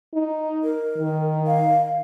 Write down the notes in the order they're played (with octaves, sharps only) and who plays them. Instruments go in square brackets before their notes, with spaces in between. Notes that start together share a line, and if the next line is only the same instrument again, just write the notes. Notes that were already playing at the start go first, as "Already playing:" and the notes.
[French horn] D#4
[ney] A#4
[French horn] D#3
[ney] F5